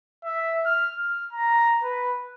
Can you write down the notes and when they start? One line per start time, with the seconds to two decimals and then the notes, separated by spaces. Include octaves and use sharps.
0.25 E5
0.66 F6
0.98 F6
1.33 A#5
1.84 B4